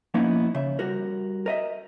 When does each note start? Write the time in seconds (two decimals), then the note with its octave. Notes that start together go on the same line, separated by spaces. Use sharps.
0.14 F3 A#3 B3 C#4 D#4 E4
0.55 C#3 E5
0.79 G3 F#4 A#4
1.46 A#4 D#5 E5